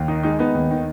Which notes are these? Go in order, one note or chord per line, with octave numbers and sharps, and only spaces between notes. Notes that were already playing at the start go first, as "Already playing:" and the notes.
Already playing: D#2
D#3 D#4
G#3 D#4
B3 D#4
D#2
D#3